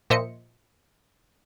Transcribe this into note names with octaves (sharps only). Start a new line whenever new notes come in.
A#2 F3 C5 D#5 E5 C#7